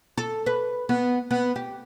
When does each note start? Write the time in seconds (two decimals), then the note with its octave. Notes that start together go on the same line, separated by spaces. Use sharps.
0.18 A4
0.46 B4
0.89 B3
1.31 B3
1.56 G4